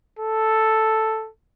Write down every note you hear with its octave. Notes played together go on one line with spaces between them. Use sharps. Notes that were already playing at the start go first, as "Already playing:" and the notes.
A4